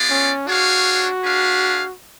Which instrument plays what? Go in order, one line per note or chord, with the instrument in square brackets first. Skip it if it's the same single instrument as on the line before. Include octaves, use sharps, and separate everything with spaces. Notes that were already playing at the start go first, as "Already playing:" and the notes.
Already playing: [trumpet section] B3 F4 G#4 D5
[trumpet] C#4
[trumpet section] D4 G#4 C#5 F5 [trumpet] F#4
[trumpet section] D4 G#4 B4 F5